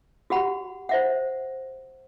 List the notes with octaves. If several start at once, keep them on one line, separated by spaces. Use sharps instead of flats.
F#4 G4 F#5 B5
C5 E5 F#5